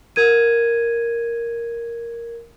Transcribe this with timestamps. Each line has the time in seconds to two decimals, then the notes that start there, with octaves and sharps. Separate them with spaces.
0.16 A#4 G#6 D#7